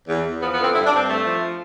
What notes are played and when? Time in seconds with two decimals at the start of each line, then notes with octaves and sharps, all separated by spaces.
0.09 E2
0.25 E2
0.41 F3 B3
0.53 B3
0.59 D3 C4
0.75 G2 E4
0.86 D4
0.91 G2
0.96 C4
1.08 A3
1.25 F3